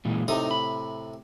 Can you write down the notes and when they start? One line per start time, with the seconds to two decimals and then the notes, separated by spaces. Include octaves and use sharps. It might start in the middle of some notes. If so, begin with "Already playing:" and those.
0.05 A#2 E3 G#3
0.28 A2 C3 D#4 D#6
0.51 B5